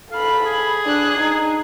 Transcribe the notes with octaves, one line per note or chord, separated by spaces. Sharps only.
A4 F5 B5
G#4
D4 F#6
D#4